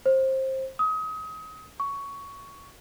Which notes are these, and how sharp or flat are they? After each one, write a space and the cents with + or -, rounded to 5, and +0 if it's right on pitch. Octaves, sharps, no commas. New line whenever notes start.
C5 +20
D#6 +30
C#6 +10